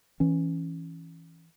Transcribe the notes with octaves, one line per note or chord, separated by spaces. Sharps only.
E3 C#4